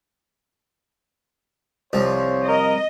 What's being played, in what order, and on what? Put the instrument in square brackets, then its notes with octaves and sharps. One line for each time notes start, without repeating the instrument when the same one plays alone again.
[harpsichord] C2 F3 [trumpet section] C5 C#5
[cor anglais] A#4 [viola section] D#5